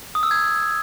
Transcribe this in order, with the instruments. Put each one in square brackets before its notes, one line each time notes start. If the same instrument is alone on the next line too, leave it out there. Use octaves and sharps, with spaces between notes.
[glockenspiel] D#6
E6
G#6